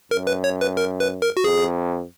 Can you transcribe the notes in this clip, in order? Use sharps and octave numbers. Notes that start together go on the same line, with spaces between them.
F#2 A#4
B4
C#5
B4
A#4
B4
A#4
F#4
F2 G#4